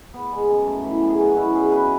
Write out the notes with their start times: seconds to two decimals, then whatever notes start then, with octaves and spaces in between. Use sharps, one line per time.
0.14 B3
0.32 G#3
0.49 F#2
0.67 A3
0.85 E3
1.02 F#2
1.09 G#4
1.20 B2 F#4
1.31 F#4
1.37 C#4 E4
1.55 B2 G#4
1.72 B2 B4